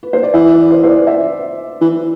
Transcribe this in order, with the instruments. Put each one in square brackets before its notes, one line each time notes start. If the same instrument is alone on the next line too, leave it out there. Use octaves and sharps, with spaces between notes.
[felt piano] B4
C5
D5
[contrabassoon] E3 [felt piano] E5
[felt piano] D5
C5
C5
D5
E5
[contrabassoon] E3